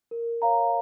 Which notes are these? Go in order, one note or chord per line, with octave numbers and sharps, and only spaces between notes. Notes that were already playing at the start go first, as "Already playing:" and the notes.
A#4
C#5 F5 A#5